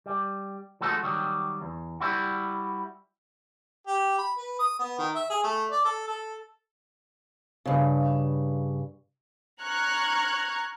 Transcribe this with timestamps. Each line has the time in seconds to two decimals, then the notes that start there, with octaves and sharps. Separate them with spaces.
0.06 G3
0.81 F3 G#3 A3 F#4 A4
1.03 D#3 F#3 G3
1.61 E2
2.01 G3 E4 F#4
3.87 G4
4.18 B5
4.38 B4
4.59 D#6
4.79 B3
4.99 D#3
5.15 E5
5.30 G#4
5.43 A3
5.71 D5
5.85 A4
6.08 A4
7.66 G2 C#3
9.61 A#5 C#6 F6 F#6 G#6